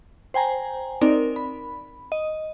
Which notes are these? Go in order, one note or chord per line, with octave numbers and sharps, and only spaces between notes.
C5 G5 G#5 A#5
C4 D#4 A#4 D5
B5
D#5